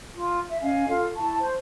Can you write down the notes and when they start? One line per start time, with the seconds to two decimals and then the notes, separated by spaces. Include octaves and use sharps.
0.15 F4
0.49 E5
0.61 C#4 D#5 F5 G#5
0.87 F4 A4 F5
1.14 E4 A5 C#6
1.38 C5